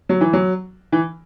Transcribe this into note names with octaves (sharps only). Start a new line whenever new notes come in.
F#3
E3
F#3
E3